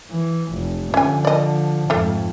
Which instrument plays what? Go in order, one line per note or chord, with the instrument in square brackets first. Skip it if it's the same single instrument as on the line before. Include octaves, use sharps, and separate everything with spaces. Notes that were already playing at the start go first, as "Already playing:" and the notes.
[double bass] E3
F1
[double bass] D3 F3 [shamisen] C#4 G#5
[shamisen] D5 D#5
[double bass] F2 G#2 [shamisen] A3 F4